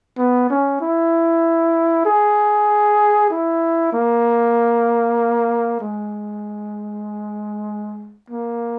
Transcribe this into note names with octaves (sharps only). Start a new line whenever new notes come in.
B3
C#4
E4
G#4
E4
A#3
G#3
A#3